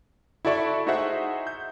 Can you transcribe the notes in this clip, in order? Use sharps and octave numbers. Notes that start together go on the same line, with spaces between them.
E4 F#4 A4 D5 E5 C#6
D#4 F#4 G#4 C5 E5 F#5
G6